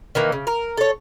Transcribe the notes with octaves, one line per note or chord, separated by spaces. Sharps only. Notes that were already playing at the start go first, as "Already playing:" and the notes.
D#3 E3 A#3
C#3
A#4
A4 C#5